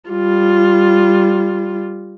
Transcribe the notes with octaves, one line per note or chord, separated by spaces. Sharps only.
G3 F4